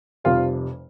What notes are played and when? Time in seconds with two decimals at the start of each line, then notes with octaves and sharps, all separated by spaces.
0.24 F1 F2 C3 G3 F4